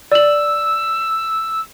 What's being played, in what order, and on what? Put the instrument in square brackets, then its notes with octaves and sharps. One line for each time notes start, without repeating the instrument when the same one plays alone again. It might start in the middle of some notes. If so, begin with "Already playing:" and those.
[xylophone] D5 F#7 [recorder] E6